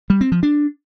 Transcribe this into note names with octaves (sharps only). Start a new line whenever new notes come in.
G3
C4
F3
D4